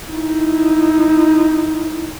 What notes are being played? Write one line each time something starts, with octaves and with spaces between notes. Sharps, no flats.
D#4 E4